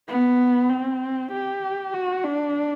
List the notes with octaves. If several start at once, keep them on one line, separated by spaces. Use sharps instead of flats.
B3
C4
G4
F#4
D4